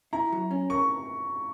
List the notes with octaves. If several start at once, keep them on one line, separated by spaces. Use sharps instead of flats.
E4 A#5
F#3
C#4
A#4 C#6